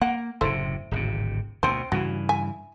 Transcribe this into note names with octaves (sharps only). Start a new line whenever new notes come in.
A#3 F#5
F#1 A2 C3 A3 E4 C5
D1 G#1 C3
D2 B2 C4 C5
G2 C#3 E3 F#4
E5 G#5